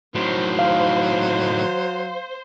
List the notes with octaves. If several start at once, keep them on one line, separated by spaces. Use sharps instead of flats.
A2 D#3 F#3 C5
F5